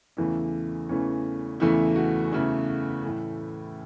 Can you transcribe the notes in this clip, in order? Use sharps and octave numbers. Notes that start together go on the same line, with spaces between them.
E2 C#3 E3 A3 E4
E2 C#3 E3 A3 C#4
E2 C#3 E3 A3 E4
F#4
E2 C#3 E3 A3 E4
A2 E3 A3